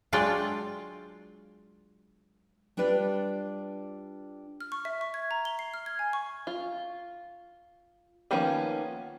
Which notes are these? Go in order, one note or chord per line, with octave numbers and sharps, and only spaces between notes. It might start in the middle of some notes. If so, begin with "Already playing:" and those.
F#3 G#3 D4 F4 G5
G3 D4 F4 B4 D5
F6
C#6
E5
C#6
G#6
A#5
G7
C7
F6
G#6
G#5
C#6
F4
D#3 F3 A#3 B3 C#4